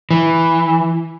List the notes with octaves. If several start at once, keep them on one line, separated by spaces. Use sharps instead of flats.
E3